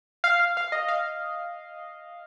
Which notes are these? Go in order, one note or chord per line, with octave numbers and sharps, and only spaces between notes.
F5
F5
F5
D#5
F5